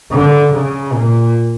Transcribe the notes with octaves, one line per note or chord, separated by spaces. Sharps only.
D3
C#3
A#2